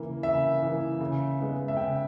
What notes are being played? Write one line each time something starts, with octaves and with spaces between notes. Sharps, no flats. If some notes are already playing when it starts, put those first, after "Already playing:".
Already playing: C#3 E3 A#3
C#3 E5
E3 A#3
C#3
G#3 B3
E5
C#3 G5